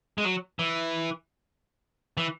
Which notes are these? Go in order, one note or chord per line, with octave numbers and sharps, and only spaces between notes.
G#3
F#3
E3
E3